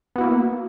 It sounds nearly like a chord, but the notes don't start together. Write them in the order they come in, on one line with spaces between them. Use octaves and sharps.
B3 F#4 E4 A#3